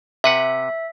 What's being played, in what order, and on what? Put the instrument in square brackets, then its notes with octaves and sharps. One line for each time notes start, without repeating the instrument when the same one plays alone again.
[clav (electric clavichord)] C3 B4 F#5 [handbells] E5